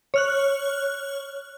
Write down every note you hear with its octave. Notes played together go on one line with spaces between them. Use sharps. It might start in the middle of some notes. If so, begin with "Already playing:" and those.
C#5 F6 F#6